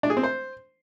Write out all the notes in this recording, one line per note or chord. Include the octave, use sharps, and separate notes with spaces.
D4
G#4
C4
C5